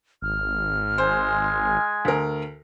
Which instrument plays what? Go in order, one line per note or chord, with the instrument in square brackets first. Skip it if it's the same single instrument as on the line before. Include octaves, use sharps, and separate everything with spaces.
[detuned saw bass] G#1 [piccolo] F6
[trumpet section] G#3 G#5 [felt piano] C5
[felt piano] D2 A#4